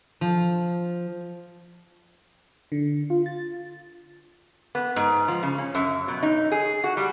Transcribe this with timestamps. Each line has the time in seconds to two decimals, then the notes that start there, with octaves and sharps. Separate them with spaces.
0.21 F3
2.72 D3
3.10 F4
3.26 A6
4.75 B3
4.96 G#2
5.28 F3
5.43 C#3
5.58 C#4
5.75 F#2
6.08 B2
6.23 D#4
6.52 G#4
6.84 F#4
6.97 G3